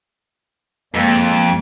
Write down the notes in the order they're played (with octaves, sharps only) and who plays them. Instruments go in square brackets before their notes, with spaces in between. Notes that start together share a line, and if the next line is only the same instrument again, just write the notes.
[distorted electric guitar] F2 [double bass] G#3 A#3